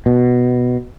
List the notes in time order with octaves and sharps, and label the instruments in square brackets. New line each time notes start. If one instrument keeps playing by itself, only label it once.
[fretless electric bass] B2